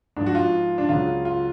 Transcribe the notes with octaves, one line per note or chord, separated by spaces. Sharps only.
G#2 F3 D4
F#4
F4
D4
C#2 C#3 F#3 F4
F4